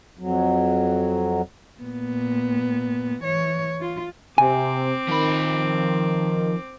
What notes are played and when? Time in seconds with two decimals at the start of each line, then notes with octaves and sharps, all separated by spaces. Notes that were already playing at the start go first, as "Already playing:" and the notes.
0.18 F2 F#3
1.81 A#2 B3
3.22 E3 C#5
3.81 F4
4.38 C3 C4 G#5 D6
5.08 D#3 F3 B5